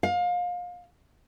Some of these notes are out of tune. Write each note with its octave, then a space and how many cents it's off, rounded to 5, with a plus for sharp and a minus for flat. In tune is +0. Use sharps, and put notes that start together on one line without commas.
F5 +30